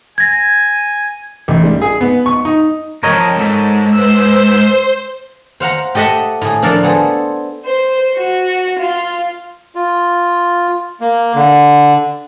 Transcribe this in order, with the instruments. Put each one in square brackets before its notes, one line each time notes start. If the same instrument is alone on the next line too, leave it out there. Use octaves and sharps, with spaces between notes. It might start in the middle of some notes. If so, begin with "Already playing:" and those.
[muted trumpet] G#5 [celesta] G#6 A#6
[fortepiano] A1
G3
G#4
B3
C#6
D#4
[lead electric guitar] F2 G#2 [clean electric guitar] A#4 C#5 D#5
[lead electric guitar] G#2 [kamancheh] A4
[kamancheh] B4 E6 [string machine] C5
[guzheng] C5 F5 F#5 A#5
G4 A4 D#5 E5 F#5
A2 G#4
F3 D4 A4 A#4 D5 F5
B3 G#4 A4 C5
[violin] C5
F#4
F4
[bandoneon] F4
A#3
D3